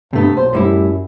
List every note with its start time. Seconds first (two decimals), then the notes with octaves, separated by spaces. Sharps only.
0.13 G2 C3 A3 B3
0.37 B1 C5
0.53 F#2 A2 G3 E4